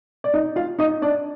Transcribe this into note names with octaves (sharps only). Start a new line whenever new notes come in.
D5
D#4 D#5
F4 F5
D#4 D#5
D4 D5